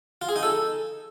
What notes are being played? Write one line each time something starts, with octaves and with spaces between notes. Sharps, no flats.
F4
G#4
D#4
A4